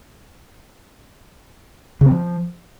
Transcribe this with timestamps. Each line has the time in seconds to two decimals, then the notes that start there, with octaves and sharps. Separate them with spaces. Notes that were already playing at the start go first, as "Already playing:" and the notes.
2.01 C#3
2.06 C4
2.11 F3